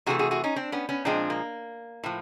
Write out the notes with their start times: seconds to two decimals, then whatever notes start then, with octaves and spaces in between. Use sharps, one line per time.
0.06 C3 E3 A3 F#4 G#4
0.19 F#4 G#4
0.31 F#4 G#4
0.44 C#4 D#4
0.56 C4 D4
0.72 B3 C#4
0.89 B3 C#4
1.05 A#2 F3 G#3 C4 D4
1.30 A#3
2.04 A2 F3